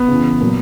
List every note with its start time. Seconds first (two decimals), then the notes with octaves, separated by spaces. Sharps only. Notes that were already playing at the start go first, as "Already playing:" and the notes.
Already playing: B3
0.08 C#3 E3
0.41 A#2 F#3